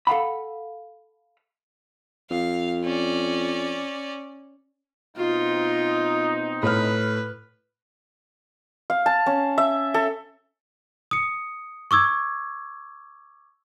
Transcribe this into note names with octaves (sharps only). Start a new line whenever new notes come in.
A4 F5 F#5 B5
F2 F5
C#4 D5
B2 C4 D#4 F4
A2 B4 F6
F5
A5
C#4
E5
A4
D#6 C#7
C#6 D6 E6 G#6